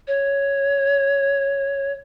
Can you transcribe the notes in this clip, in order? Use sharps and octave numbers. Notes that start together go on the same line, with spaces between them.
C#5